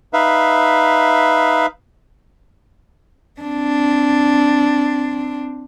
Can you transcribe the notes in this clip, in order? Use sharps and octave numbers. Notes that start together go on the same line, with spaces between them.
D#4 B4 E5 F5
C4 D4